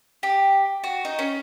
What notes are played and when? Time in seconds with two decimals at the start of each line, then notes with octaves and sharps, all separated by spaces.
0.23 G4
0.84 F#4
1.05 D#4
1.19 C#4